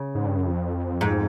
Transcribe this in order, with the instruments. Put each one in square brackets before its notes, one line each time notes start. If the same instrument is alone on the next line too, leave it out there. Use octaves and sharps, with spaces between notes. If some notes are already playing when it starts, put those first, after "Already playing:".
Already playing: [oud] C#3
[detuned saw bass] G#2
G2
F#2
F2
[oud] G#2